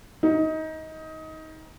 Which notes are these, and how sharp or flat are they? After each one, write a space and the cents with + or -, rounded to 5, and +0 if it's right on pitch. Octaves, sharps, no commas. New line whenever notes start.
D#4 +20